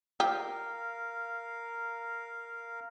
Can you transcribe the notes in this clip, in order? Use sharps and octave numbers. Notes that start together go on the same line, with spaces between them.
F4 G4 A#4 F5